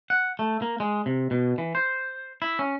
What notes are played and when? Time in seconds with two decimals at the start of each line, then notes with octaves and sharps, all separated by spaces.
0.10 F#5
0.39 A3
0.62 A#3
0.80 G#3
1.06 C3
1.31 B2
1.58 E3
1.75 C5
2.42 E4
2.59 C#4